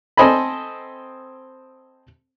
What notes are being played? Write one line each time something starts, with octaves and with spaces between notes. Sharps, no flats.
C4 A4 C5 D#5 G#5 B5